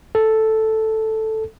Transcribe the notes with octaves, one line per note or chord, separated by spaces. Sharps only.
A4